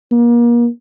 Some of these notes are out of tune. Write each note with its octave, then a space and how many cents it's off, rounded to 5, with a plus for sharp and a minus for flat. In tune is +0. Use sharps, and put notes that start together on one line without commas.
A#3 +35